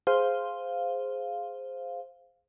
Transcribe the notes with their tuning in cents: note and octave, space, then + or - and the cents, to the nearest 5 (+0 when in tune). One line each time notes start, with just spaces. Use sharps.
G#4 +0 C5 +0 F5 +0